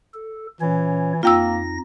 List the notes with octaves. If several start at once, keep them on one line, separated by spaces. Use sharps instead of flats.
A4
A#2 E3 C#4 C#5
F2 A#3 D#4 F4 G5 E6 A#6